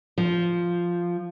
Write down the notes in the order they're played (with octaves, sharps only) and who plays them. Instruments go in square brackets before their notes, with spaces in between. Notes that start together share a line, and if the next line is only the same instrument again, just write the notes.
[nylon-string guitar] F3